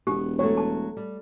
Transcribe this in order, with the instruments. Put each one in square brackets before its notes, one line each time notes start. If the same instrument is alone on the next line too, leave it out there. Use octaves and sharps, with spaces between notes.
[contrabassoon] E1 [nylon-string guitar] B3 [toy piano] G4
[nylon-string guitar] F#3 A3 [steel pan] C#5
[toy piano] A5
[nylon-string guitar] G3